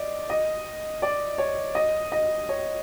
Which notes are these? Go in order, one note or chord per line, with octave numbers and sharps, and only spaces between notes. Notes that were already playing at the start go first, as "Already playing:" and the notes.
Already playing: D5 D#5
D#5
D5
C#5
D#5
D#5
C#5